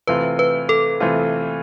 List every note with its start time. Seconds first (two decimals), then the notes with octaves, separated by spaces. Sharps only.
0.07 C3 E3 A3 C4 F4 B4
0.39 B4
0.69 A4
1.00 C3 E3 A3 C4 F4